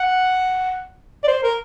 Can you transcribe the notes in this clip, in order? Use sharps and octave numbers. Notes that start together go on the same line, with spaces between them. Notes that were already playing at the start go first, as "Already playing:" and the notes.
Already playing: F#5
D5
C5
A#4